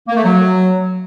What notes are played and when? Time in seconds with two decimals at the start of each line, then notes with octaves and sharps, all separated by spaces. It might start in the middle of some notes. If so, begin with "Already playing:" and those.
0.08 A#3
0.16 A3
0.24 F#3